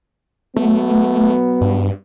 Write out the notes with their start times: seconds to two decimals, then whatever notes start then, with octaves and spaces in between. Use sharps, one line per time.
0.57 F#3 A3 B3
1.61 G2